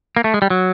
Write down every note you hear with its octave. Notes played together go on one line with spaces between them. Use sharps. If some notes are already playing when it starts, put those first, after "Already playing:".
A#3
A3
G#3
G3
F#3